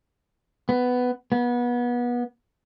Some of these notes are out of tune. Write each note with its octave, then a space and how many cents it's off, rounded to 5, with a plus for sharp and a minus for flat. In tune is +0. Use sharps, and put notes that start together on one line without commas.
B3 +10
B3 -25